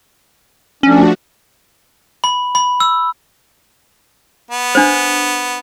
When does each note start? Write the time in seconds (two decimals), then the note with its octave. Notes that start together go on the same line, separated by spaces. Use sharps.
0.83 F3 A3 C#4 D4 F#4
2.24 B5
2.55 B5
2.80 E6
4.51 B3
4.75 D4 C5